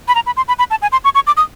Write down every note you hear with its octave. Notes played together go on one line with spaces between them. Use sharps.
B5
A#5
B5
C6
B5
B5
A5
G#5
C6
C#6
C#6
D6
D#6